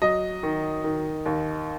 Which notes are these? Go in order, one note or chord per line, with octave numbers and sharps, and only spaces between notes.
F#3 D#5
D#3
D#3
D#2